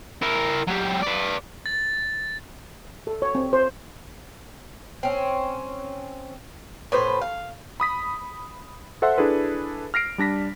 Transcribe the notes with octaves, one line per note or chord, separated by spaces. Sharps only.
E4 A#4
F#3 G4
B4 D5
A6
A4
C#5
C4
C5
C4 C#4
A2 B4 C5
F5
B5 D#6 B6
A4 C5 E5 F#5 C6
D4 E4 G#4 A4 B4
F6 A#6 C7 D7
G3 D4 A#6 B6